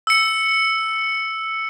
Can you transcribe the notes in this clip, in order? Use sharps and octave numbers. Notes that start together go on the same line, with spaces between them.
E6 C#7